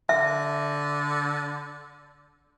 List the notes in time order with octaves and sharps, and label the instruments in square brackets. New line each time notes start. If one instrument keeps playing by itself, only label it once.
[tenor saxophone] D3 [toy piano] E5